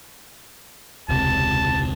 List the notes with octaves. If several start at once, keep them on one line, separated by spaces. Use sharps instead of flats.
E1 C#2 C3 A5